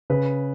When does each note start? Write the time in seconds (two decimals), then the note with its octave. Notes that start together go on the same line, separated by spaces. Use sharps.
0.10 C#3 B4